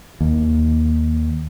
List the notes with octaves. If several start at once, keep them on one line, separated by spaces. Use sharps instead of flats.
D#2